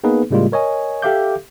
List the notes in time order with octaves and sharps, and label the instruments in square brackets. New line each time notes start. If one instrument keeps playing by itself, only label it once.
[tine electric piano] A#3 B3 D#4 G#4 B4
A2 C#3 G3 G#3 A#3 F4
A#4 C#5 D#5 G#5
G4 A4 E5 F5 D6 G6